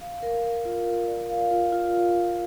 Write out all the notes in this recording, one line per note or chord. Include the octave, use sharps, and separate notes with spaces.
F5
A#4
A#4
F4
A#4
D5
F5
F4
F4